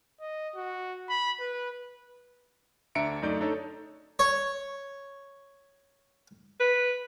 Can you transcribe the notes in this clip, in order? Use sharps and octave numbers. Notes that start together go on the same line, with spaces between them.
D#5
F#4
B5
B4
D2 D4 E5 A#5 C#7 D7
F#2 A3 D#4 D5 G6 D7
D4 D#4 A4 C#5
C#5
B4